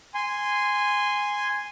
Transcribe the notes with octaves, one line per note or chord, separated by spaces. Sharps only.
G#5 C6